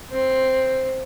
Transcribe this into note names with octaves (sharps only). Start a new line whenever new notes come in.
C4